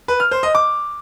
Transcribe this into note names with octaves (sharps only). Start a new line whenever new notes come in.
B4
F6
C5
D#5
D6